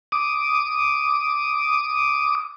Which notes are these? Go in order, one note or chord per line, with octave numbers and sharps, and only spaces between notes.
D6 D#6